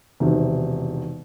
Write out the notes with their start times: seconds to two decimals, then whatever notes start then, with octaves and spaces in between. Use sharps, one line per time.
0.20 E1 C3 D#3